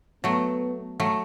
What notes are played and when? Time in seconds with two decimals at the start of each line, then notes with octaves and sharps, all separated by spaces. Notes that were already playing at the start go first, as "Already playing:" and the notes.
0.24 F#3 A3 B3
1.00 F#3 A3